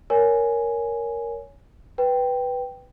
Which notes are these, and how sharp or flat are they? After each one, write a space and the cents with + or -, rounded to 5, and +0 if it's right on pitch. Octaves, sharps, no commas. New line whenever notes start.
A#4 +0 C#5 +15 G#5 +0
B4 +0 G5 +0